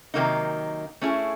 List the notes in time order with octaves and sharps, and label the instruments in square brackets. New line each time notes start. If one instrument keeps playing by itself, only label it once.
[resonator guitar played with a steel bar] C3 D#3 F#3 A#3 D#4
A3 C#4 E4 G#4